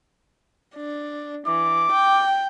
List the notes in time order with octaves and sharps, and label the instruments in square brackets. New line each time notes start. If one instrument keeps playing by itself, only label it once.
[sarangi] D4
[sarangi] E3 [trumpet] D6
[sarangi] G5